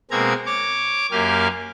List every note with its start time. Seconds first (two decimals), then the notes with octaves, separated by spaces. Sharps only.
0.11 B2 G#3 A#3 C4 A#5 G#6
0.46 C#5 D6
1.12 F#2 A#3 G4 G#5 F6